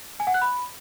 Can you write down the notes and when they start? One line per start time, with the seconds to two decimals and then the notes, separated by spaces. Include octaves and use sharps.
0.20 G#5
0.27 F#5
0.34 F#6
0.42 B5